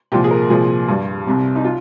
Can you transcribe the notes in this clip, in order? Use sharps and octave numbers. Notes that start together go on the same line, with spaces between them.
C2 A#2 F3 G4
G#4
A#4
C2 A#2 F3 G#4
G2 G3
C2 C3 G3
D#4
F4